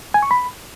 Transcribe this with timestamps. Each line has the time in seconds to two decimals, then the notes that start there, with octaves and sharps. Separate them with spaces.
0.14 G#5
0.23 C#6
0.31 B5